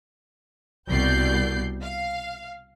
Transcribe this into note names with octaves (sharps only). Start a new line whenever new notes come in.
C2 B2 D5 G6 C7
F5